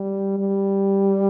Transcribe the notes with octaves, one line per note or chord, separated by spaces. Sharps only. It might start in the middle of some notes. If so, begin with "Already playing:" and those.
Already playing: G3
G3